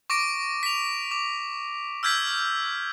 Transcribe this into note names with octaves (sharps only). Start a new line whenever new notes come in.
C#6 D6 A#6 D7
B6 F7
D6
E6 F6 G6 G#6 B6